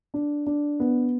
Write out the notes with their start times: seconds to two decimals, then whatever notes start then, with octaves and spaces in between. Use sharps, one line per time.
0.14 D4
0.47 D4
0.80 B3